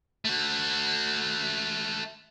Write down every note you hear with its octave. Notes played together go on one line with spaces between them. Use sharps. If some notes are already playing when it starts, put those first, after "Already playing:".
A3 F#4